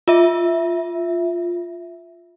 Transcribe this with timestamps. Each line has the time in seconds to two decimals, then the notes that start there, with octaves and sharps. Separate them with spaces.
0.08 F4 E5